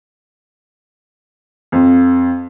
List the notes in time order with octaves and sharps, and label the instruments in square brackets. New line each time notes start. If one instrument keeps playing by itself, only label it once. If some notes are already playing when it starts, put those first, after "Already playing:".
[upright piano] F2